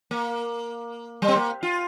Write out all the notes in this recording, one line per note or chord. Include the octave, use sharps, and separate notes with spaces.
A#3
G3
C4
A#3
F4